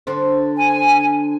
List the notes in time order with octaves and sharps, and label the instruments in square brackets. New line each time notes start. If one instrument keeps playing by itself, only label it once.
[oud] D3 D4 C5
[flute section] G#5